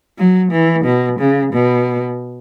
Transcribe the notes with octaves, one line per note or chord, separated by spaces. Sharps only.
F#3
E3
B2
C#3
B2